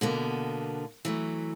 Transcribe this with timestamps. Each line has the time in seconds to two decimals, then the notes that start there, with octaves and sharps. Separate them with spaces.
0.01 B2 D3 A#3 B3
1.05 E3 F#3 A3